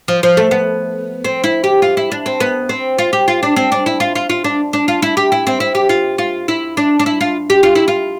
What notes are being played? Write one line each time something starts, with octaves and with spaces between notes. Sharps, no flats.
F3
F3
A3
B3
C4
E4
G4
F4
E4
D4
C4
B3
C4
F4
G4
F4
D4
C4
D4
E4
F4
F4
F4
D4
D4
F4
E4
G4
E4
C4
E4
G4
F4
F4
E4
D4
D4
E4
F4
G4
F4
E4
F4